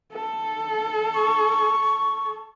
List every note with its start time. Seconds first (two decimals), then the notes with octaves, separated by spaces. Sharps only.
0.13 A4
1.14 C#6